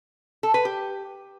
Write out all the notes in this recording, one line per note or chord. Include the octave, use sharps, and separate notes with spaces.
A4
B4
G4